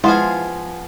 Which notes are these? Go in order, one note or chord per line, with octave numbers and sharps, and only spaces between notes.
F3 G#3 B3 E4 F4 G#4 C5 F5